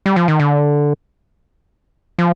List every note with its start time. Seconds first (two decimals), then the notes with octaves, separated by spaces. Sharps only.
0.06 G3
0.16 F3
0.28 D#3
0.40 D3
2.19 F3